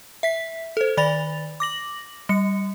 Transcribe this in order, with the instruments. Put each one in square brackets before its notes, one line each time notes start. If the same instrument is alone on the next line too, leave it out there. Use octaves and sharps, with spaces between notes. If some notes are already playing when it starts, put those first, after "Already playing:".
[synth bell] E5 B6
A4 C5
D#3 D5 B5 A6 F7
D6 A#6 F#7
G3 C#7